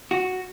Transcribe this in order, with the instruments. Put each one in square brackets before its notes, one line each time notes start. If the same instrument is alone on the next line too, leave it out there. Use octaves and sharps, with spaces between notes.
[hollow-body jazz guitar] F#4